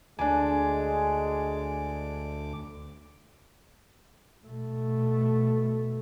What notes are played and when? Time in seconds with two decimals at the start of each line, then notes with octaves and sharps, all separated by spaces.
0.19 D2 G#3 D4 G#5 D6
4.47 B2 A3